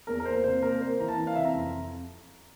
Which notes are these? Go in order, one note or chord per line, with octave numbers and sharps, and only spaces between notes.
E2 A#4
A#4
A#3 C5
C3 C5
A#3 A#4
A#3 C5
E3 A#5
A5
E3
F5
C3 E5
A#5
F2